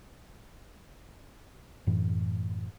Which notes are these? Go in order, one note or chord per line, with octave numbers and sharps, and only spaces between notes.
F#2 A2 E3